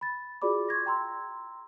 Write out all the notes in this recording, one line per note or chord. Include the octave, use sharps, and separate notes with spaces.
B5 A6
F4 F#4 G#4 D5 B5 D6
C6 C#6 G#6 A#6
G5 A#5 C6 E6